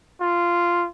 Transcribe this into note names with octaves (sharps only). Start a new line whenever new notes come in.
F4